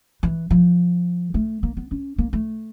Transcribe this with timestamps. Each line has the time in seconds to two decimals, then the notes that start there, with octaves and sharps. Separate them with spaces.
0.23 E3
0.50 F3
1.34 A3
1.63 A#3
1.77 B3
1.91 C#4
2.18 A#3
2.33 A3